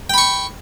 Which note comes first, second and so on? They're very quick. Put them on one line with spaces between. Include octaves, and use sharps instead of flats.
G5 B5 C#6